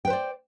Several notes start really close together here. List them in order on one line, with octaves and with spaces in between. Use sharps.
G5 B4 C5 D5